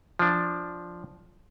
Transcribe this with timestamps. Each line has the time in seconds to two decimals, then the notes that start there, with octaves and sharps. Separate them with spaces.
0.19 F3 D4